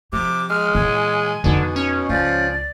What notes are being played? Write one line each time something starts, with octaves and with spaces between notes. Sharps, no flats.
C3 F3 D6
G#3 F6
A#2 E3 G#5
F2 B2 D3 D#4
C#4
C#2 F3 D5